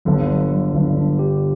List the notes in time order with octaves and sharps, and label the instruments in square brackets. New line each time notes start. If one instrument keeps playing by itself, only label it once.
[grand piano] G1 G2 D3 [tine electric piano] F#3
[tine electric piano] F#3
F#3
[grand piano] G1 G2 D3 [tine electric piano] F#3
[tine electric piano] D4
G4